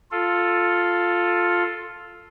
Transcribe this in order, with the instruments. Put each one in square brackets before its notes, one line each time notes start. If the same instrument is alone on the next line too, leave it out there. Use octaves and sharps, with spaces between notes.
[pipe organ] F4 A4